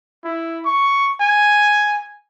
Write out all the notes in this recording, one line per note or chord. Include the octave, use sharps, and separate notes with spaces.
E4
C#6
G#5